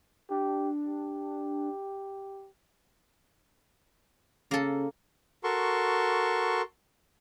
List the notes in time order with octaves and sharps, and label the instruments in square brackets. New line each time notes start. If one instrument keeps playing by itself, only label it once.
[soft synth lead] D4 [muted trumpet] G4
[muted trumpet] G4
[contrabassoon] C#3 [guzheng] A#3 A4
[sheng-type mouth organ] F#4 A4 A#4 C6 C#6